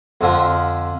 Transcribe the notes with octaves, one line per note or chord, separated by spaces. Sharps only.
F2 D3 F3